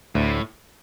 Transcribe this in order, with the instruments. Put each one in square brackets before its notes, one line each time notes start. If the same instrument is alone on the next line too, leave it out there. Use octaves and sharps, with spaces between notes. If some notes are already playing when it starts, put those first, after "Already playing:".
[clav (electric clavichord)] D2 [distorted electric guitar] A2